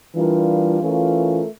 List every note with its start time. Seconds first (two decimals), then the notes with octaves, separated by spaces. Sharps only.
0.14 E3 G3 D4 F4 A#4
0.80 E3 A3 C#4 F4 A#4